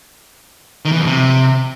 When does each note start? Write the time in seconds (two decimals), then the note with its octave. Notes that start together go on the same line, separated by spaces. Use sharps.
0.85 D#3
0.92 E3
0.99 F2
1.06 C3